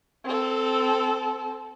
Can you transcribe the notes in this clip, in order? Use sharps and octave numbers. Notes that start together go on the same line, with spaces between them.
C4 A4